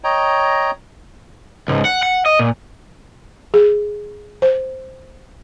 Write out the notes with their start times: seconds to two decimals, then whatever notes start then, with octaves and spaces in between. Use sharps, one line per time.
0.04 C#5 D#5 G5 A#5
1.68 C#2 G#2
1.85 F#5
2.03 F#5
2.26 D#5
2.39 A#2
3.54 G#4
4.42 C5